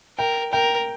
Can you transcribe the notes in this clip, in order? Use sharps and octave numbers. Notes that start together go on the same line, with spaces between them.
A#4 G5
A#4 G5